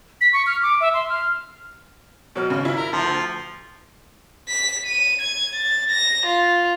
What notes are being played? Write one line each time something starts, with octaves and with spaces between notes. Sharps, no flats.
B6
C#6
F6
D6
E5
C6
F6
B2 F#3 F6
G#1 C#3
E4
A#4
D2 F3
B6
D#7
G#6
A6
A#6
F4